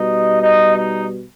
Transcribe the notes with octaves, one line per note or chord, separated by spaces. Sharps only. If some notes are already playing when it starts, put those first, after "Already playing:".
Already playing: B2 G3 D#4 D#5
D#4 D#5
D#4 D#5